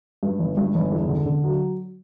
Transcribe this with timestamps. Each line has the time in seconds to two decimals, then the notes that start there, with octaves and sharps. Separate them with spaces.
0.23 G2
0.40 G1
0.57 G2
0.75 G1
0.91 E2
1.09 D3
1.26 D3
1.44 F#3